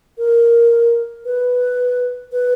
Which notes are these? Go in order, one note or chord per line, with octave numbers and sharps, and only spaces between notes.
A#4
B4
B4